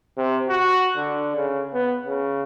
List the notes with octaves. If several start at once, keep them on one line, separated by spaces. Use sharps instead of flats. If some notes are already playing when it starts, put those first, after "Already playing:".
C3
F#4
D3
C#3
B3
C#3